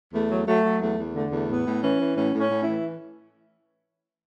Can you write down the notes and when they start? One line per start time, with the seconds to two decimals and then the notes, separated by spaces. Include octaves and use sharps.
0.13 E2 A3
0.31 F#3
0.47 F#3 A3
0.64 F#3
0.81 E2 A3
0.99 E2
1.15 D3 A3
1.31 E2 A3
1.49 A2 B3
1.67 A2
1.83 E3 C#4
2.00 E3
2.16 A2 C#4
2.34 A2
2.40 C#4
2.51 A2
2.63 E3 E4